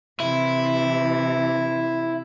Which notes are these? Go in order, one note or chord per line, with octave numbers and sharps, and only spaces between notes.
C3 E3 E4